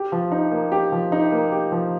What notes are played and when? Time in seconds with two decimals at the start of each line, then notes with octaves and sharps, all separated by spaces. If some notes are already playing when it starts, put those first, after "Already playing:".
Already playing: G4
0.12 F3
0.32 D#4
0.51 A#3
0.72 G4
0.92 F3
1.12 D#4
1.32 A#3
1.52 G4
1.72 F3